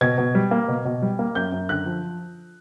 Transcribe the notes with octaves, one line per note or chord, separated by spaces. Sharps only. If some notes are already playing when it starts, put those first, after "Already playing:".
B2 G#6
B2
G3
A#3
B2
B2
G3
A#3
F#2 G6
F#2
D3 F#6
F3